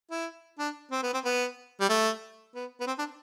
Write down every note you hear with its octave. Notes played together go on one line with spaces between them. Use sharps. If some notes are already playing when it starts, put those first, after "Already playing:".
E4
D4
C4
B3
C4
B3
G3
A3
B3
B3
C4
D4